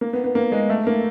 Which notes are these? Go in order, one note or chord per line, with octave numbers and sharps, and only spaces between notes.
A#3
B3
B3
A#3
G#3
A3
A#3